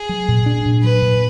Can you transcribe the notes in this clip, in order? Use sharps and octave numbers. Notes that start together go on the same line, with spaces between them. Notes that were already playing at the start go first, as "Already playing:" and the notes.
Already playing: G#4
F#3
A#2
D4
A#2
F#3 B4
A#2